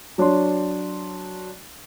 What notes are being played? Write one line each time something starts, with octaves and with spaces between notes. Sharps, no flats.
F#3 D4 C#5 C6